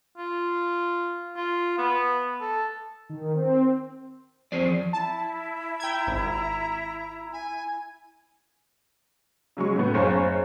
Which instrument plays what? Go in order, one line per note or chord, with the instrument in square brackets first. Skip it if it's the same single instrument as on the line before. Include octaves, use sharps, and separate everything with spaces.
[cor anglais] F4
F4
B3
A4
[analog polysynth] D#3
C4
[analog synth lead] F3 [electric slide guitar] C4 G#4 D5
[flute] E4 [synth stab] A5
[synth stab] G5 G#6 [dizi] A#5
[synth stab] G#1
[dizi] G#5
[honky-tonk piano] C#3 F#3 G#3 C#6
A2 B3
F#1 C5 C#5 F5 G#5 C#6